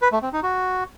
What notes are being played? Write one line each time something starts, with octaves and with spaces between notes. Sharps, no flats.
B4
A3
C4
D#4
F#4